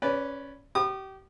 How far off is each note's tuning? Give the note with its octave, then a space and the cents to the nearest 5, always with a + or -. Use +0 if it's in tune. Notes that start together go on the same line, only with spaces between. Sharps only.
C#4 +0 B4 +0 D5 -20
G4 -30 D#6 -40